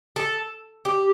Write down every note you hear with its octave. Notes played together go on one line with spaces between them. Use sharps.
A4
G4